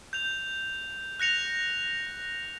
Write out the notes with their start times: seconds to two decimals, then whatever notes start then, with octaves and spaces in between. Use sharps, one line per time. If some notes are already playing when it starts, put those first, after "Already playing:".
0.13 G6 F7
1.20 F#6 A#6 C#7 F7